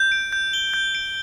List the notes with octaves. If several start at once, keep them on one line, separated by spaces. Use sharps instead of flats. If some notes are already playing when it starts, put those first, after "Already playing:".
Already playing: G6
D7
G6
G7
G6
D7